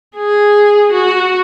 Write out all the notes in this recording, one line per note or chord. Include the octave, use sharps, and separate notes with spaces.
G#4
F#4